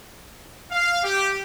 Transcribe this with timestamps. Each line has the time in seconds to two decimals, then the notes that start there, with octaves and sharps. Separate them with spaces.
0.71 F5
1.03 G4